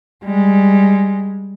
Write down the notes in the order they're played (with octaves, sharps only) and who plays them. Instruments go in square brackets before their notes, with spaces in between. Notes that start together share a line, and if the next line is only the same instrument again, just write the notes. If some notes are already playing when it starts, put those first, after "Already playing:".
[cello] G3 G#3